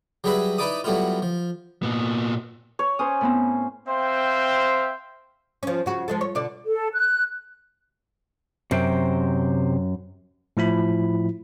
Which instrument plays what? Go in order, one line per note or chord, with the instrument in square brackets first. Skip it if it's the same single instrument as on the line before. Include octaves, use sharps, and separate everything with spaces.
[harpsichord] F#3 G3 G#4 B4 E5 B5
D#4 E4 B4 D5 D6 D#6
F#3 G3 A3 B3 E4 F4
F3
[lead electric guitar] A#2 B3
[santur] C#5
[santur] C#4 C5 [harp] D#6
[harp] A2 B3 C4
[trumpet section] C4 C5 E5 F5 G5 C6
[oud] F3 C#4
C#3 F#4
F3 G#3 A4
C#5
B2 D3 D5
[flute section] A4
F#6
[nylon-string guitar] F#2 [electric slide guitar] C3 C5 G5
[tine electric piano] A2 F3 E4 B5